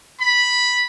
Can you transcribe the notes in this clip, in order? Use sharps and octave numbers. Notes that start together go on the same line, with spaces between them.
B5